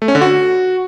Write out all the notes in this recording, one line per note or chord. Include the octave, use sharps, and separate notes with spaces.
A3
C#4
D3
F#4